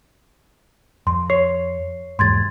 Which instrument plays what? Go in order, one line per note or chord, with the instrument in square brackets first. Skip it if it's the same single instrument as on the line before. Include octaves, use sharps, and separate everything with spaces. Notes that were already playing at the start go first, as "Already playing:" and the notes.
[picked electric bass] F2 [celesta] C6
[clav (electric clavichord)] C#5 [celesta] C7
[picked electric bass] E2 G#2 [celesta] C6 G#6 A6